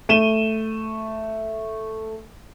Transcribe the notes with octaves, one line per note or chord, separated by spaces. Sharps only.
A3 D#7 E7 G7